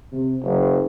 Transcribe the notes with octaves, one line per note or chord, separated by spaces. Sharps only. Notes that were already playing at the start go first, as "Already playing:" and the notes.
C3
F#1